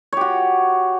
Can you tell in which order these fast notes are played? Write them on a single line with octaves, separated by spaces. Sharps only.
C#5 G4 F#4